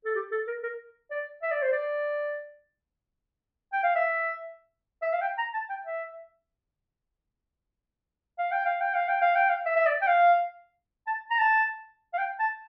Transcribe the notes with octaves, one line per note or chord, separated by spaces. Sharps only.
A4
G4
A4
A#4
A#4
D5
E5
D5
C5
D5
G5
F5
E5
E5
F5
G5
A#5
A5
G5
E5
F5
G5
F5
G5
F5
G5
F5
G5
F5
E5
E5
D5
G5
F5
A5
A#5
A5
F5
G5
A5